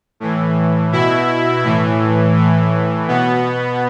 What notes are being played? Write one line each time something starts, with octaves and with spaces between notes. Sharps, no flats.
A2 E3
B2 E4
A2 E3
A2 E3
B2 B3